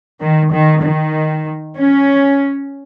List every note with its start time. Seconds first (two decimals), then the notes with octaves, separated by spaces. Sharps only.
0.21 D#3
0.52 D#3
0.83 D#3
1.77 C#4